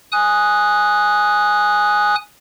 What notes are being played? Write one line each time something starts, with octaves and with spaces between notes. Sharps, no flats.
G#5 D#6 F#6